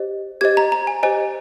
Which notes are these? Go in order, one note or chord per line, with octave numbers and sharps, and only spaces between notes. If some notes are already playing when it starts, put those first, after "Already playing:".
Already playing: G4 C5 D#5
G4 C5 D#5 G#6
A#5
A#5
G#5
G4 C5 D#5 G#5